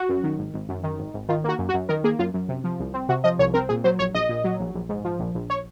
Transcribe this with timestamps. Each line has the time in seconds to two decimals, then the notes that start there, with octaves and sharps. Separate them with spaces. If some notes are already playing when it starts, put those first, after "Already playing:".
Already playing: F#4
0.09 F#2
0.24 D#3
0.38 G#1
0.54 G#1
0.69 F#2
0.83 D#3
0.99 G#1
1.14 G#1
1.29 D#3 F4
1.44 A#3 F#4
1.59 F#2
1.69 F#4
1.74 F#2
1.89 D#3 A#4
2.04 A#3 G#4
2.19 F#2 F4
2.34 F#2
2.49 C3
2.64 F3
2.79 C2
2.94 C4
3.09 C3 F#4
3.24 F3 D#5
3.39 C2 C#5
3.54 C4 A#4
3.69 A#2 G#4
3.84 F#3 C5
3.99 A#1 C#5
4.15 A#1 D#5
4.29 A#2
4.44 F#3
4.59 A#1
4.74 A#1
4.89 G#2
5.05 F3
5.19 A#1
5.35 A#1
5.50 C#5